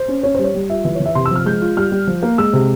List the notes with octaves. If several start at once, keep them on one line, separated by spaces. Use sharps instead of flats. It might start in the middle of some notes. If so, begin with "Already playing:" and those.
Already playing: C5
C#4
C#4 C#5
G3 C5
C#5
G3
F4 E5
E3 E5
E3 C#5
E5
C3 C6
E6
F3 F6
G#3 G6
F4
G3 F6
G3
F3
A#3
G#3 E6
C3